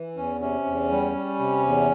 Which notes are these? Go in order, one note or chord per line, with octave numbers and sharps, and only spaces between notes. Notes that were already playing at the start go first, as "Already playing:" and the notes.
Already playing: E3
E2 C#4
C3 C#4
E2
G3
G3
C3
E2